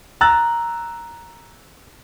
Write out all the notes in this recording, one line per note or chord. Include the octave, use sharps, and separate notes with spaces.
A#5 E6 F#6 A6